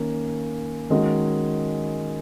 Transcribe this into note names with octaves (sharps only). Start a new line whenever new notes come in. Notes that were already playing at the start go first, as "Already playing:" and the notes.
Already playing: D#3 A#3 C#4
D#3 G#3 C#4 F#4